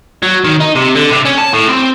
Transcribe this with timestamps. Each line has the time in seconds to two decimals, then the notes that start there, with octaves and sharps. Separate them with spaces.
0.22 F#3
0.44 D#3
0.61 D#4
0.76 C3
0.96 D3
1.11 C3
1.26 C#4
1.38 A5
1.54 A2
1.70 C4